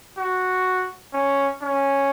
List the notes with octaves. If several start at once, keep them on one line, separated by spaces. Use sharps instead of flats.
F#4
C#4
C#4